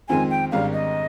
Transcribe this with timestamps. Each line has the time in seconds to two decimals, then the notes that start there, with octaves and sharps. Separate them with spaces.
0.08 F2 D#3 G#3 C4 F4 G#5
0.30 G5
0.52 G#1 G#2 D#3 G3 D4 F5
0.73 D#5